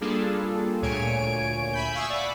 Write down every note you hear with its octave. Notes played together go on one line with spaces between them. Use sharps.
G3 A#3 D4 F4 G#4 A4
D2 A#2 C#5 G#5 D7
E5 G#5 B5 G6
E5 F5 G#5 C#6 D#6 E6
D5 F#5 B5